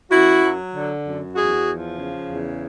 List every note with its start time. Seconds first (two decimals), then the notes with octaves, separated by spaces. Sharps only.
0.11 F#2 E4 F#4
0.42 F#3
0.73 D3
1.05 F#2
1.35 E2 F#4 G#4
1.66 F3
1.98 C#3
2.28 E2